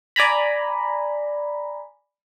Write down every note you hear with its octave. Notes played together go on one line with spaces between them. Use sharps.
D5 G#5 A#5 B5